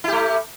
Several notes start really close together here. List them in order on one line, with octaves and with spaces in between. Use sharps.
E4 G4 A3